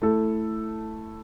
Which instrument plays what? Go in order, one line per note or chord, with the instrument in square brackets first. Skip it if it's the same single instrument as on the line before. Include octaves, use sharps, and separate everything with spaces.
[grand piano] A3 E4 A4